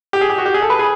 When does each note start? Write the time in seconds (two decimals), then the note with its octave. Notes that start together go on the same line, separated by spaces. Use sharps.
0.13 G4
0.21 G#4
0.30 G4
0.38 F#4
0.46 G4
0.54 G#4
0.62 A4
0.70 B4
0.79 G#4